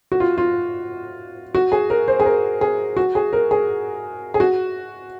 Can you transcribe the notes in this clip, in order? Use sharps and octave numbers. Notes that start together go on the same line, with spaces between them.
F#4
F4
F4
F#4
G#4
A#4
C5
G#4
A#4
G#4
F#4
G#4
A#4
G#4
G#4
F#4